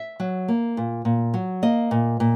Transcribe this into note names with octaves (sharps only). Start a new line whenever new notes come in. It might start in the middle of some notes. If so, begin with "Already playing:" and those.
Already playing: E5
F#3
A#3
A#2
A#2
F#3
A#3 D#5
A#2
A#2